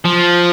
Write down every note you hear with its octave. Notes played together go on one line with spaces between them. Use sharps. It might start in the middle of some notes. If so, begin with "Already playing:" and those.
F3